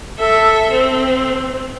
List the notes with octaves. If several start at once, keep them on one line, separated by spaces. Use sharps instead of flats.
A4 E5
C4